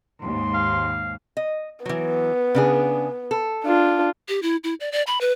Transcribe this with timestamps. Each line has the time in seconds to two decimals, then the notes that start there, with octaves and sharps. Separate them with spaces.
0.22 D#2 G#2 C6
0.54 F5
1.37 D#5
1.86 E3 F#3 B3
2.55 C#3 D4 G#4
3.31 A4
3.65 D4 F4
4.29 G4
4.43 E4
4.64 E4
4.80 D5
4.92 D5
5.07 B5
5.21 B4